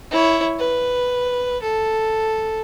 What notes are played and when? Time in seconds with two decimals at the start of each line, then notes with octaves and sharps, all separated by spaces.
0.11 E4 C#5
0.59 B4
1.62 A4